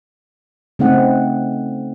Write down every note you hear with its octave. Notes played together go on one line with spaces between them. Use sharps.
C#3 A3 C4 D#4 F#5